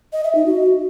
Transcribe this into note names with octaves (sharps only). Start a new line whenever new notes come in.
D#5
E5
D#4
F#4